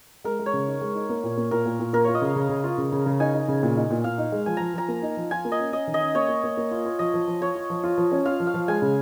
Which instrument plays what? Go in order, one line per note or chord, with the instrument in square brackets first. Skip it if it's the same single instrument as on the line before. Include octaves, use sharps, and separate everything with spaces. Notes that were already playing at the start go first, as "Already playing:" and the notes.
[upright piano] G#3 [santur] A#4
[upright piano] G#3
[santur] C#5
[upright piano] C#3
D#4
G#3
D#4
A#3
A#2
A#3
[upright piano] A#2 [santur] A#4
[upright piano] A#2
A#2
[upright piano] A#3 [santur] A#4
[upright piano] F4 [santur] C#5
[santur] D#5
[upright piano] C#3 [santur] F5
[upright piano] C#3
C#3
F4
C#3
C#3
C#3
[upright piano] D#4 [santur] G#5
[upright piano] D#4
C#3
A#2
D#4
A#2
[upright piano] A#2 [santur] F5
[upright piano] D#4
G#3
[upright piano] F3 [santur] G#5
[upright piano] F3 [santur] A#5
[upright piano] F3 [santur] A#5
[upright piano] A#3
D#4
F3
[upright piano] F4 [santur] G#5
[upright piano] A#3
[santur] D#5
[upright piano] C#4
[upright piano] C#4 [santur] D#5
[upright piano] D#3
[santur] D#5
[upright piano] C#4
[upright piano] A#3 [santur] C#5
[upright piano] A#3
A#3
A#3
F4
F4
[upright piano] F3 [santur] D#5
[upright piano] F3
F3
[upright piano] F4 [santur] C#5
[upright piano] F4
F3
F4
F3
C#4
[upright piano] F4 [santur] F5
[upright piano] F3
[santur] F5
[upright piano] F3
[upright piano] G#3 [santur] G#5
[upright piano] C#3